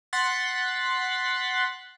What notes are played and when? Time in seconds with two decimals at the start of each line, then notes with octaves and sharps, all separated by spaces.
0.13 F#5 C6 F#6 A6 B6